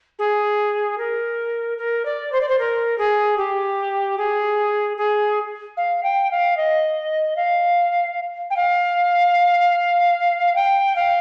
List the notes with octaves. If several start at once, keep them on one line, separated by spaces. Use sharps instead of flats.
G#4
A#4
A#4
D5
C5
D5
C5
A#4
G#4
G4
G#4
G#4
F5
G5
F5
D#5
F5
G5
F5
G5
F5